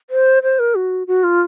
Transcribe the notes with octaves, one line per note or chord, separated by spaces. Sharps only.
C5
C5
A#4
F#4
F#4
F4